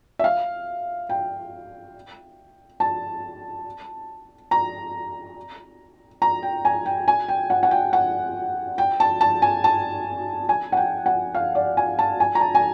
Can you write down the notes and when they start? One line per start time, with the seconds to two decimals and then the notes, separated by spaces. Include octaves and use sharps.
0.19 E5
0.24 F5
1.09 G5
2.80 A5
4.51 A#5
6.22 A#5
6.43 G5
6.65 G#5
6.86 G5
7.08 G#5
7.28 G5
7.50 F#5
7.63 F#5
7.71 G5
7.93 F#5
8.78 G5
9.00 A5
9.21 A5
9.42 G#5
9.64 A5
10.49 G#5
10.72 F#5
10.77 G5
11.06 F#5
11.35 F5
11.55 D5
11.77 G#5
11.99 A5
12.20 G#5
12.35 A#5
12.41 A5
12.55 G#5